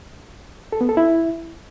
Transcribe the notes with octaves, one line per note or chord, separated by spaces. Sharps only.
A4
B3
A4
E4